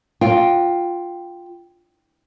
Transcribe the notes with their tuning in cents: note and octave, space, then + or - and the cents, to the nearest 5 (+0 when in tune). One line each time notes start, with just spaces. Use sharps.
F4 +5 G5 +0